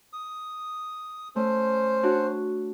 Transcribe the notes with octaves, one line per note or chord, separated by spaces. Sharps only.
D#6
A3 C#4 C5
D4 F#4 C#5